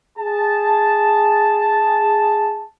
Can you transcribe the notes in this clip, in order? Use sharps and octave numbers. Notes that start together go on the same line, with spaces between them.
G#4 A5